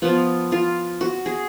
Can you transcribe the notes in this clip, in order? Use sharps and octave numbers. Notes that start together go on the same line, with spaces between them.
F3 B3 F4
F4
F#4
G#4